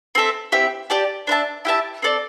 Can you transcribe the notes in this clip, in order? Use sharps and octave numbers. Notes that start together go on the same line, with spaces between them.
C4 A4 E5
C4 E4 G4 E5
G4 D5 A5
D4 C5 E5 A5
E4 G4 E5 A5
C4 A4 D5